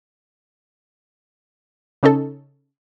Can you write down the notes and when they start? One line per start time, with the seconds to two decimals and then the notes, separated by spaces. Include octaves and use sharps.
2.03 C#3 C#4 D#4 A4